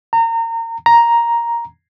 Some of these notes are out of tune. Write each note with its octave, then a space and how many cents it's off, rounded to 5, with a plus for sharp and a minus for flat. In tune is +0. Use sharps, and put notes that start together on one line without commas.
A#5 -30
A#5 +5